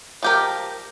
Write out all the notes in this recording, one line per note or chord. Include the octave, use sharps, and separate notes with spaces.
F3 G4 A#4